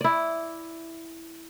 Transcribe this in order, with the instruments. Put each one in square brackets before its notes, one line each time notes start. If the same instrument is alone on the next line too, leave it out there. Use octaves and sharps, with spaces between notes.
[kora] E4 D5